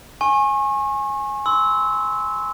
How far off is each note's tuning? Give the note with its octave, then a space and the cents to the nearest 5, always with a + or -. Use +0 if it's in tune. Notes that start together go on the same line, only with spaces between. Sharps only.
G#5 +0 C#6 -35
C6 -20 E6 -20